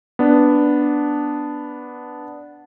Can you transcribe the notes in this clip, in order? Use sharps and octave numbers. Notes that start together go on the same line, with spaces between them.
B3 D4